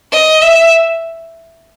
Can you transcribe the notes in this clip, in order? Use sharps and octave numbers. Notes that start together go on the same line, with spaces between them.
D#5
E5